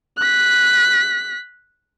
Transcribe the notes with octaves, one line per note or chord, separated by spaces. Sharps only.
F#6 B6